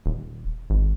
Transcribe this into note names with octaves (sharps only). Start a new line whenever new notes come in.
D#1
G#1